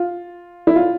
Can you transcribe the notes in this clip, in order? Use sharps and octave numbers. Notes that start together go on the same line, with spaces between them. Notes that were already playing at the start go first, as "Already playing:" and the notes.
Already playing: F4
E4
F4